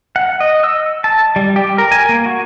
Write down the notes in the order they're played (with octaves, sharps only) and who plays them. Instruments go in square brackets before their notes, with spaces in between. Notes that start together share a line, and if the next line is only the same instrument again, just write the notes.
[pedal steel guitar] F#5
D#5
E6
A5
G3
G4
A#4
G#5
A#3
F#4